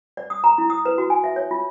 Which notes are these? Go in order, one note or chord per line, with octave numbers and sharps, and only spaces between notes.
D5
D#6
A#5
E4
D#6
B4
F#4
G#5
E5
C#5
F4